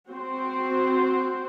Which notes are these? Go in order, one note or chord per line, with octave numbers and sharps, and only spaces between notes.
C4 F#4 C5